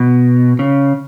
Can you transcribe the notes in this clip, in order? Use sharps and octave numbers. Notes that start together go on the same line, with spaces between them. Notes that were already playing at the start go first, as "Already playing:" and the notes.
Already playing: B2
C#3